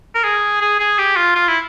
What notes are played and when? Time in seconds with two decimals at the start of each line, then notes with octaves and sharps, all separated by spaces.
0.15 A#4
0.24 G#4
0.61 G#4
0.80 G#4
0.98 G4
1.16 F4
1.35 F4
1.48 E4